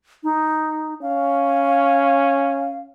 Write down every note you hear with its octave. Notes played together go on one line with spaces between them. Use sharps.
D#4
C#4 F5